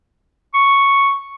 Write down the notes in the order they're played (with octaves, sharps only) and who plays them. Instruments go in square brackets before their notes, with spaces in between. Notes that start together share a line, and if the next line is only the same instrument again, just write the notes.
[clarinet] C#6